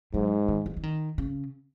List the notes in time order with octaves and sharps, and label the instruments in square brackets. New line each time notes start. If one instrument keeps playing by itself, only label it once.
[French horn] G#2 [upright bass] F#3
[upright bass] D#3
E3
E3
D#3
C#3